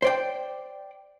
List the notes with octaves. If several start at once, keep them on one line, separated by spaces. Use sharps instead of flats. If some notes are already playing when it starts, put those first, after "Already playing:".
C5 D5 G5